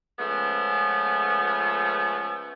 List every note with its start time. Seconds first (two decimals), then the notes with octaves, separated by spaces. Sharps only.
0.19 F3 G#3 A3 B3 C#4